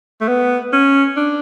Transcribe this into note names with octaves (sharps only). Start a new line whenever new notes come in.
A3
B3
C#4
D4